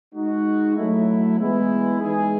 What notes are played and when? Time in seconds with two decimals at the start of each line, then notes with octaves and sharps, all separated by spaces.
0.14 G#3 D#4 F#4
0.75 F#3 A3 E4
1.38 E3 G#3 B3 E4
1.99 E3 G#3 D#4 G#4